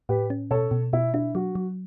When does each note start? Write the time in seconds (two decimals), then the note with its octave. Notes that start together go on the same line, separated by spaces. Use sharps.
0.09 A2 G4 B4
0.30 C#4
0.51 B2 A4 C#5
0.71 B2
0.93 B2 E4
1.14 D4 E4
1.35 F#3 F#4
1.55 F#3